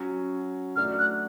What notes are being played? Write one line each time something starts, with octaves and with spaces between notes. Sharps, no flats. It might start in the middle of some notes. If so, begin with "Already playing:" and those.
Already playing: F#3 C#4 F#4
F#3 A3 D4 F#4 F6
F#6